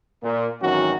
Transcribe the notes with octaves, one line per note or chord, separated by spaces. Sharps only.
A#2
G#1 D#3 E3 F#3 C#4 F#4